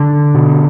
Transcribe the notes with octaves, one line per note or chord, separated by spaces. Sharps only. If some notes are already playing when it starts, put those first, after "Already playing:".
Already playing: D3
B2